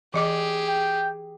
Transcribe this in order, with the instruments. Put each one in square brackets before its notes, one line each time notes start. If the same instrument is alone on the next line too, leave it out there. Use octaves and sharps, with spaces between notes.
[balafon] E3 D#5 D6 [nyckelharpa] G4 G#4
[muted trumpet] G5